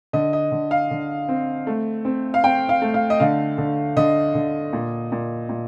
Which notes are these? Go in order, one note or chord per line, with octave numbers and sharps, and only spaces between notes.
D3 D#5
D#5
D3
F5
D3
C4
A3
C4
F5
C4 G5
F5
A3
F5
D#5
D3 F5
D3
D3 D#5
D3
A#2
A#2
A#2